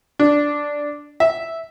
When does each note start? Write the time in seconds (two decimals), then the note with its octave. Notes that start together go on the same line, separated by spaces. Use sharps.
0.19 D4
1.20 E5